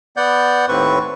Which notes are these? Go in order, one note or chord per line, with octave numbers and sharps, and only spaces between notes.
B3 D5 F#5 G6
D#2 A2 C4 B4 C#6